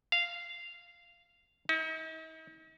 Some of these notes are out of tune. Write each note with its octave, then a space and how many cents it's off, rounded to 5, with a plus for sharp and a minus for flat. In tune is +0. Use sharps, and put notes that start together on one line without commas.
F5 -10
D#4 +45